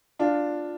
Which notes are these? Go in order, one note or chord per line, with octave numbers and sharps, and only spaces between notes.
D4 F4